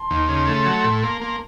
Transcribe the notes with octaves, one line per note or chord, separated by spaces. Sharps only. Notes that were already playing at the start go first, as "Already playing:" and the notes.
Already playing: A5 C6
D#2
C#3
A3
F#3
A2
A#3
A#3